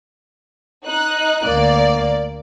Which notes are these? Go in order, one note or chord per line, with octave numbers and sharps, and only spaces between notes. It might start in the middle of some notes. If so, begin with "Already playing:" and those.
D#4 F#6
D2 A#3 D5